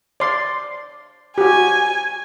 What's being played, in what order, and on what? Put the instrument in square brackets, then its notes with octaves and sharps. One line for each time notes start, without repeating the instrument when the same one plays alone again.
[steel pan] D5 C6
[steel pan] F#4 G4 [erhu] G#5